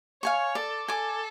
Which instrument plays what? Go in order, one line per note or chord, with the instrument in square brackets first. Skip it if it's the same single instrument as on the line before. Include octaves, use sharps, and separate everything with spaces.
[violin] C#5 [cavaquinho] F5 G#5 C#6
[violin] A4 [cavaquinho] D5
[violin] A4 [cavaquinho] G#5 D6